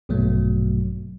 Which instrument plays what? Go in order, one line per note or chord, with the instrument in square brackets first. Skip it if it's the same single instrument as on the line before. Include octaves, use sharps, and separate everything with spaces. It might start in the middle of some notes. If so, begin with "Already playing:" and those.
[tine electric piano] A#1 G2 B2 F#3 A3